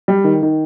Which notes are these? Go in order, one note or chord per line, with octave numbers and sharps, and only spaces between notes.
G3
D#3
D#3